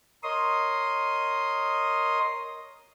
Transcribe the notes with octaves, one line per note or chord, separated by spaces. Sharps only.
A#4 C#5 D#5 C6 D#6